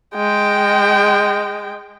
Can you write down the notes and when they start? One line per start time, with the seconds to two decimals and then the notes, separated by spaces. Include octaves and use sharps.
0.15 G#3 G5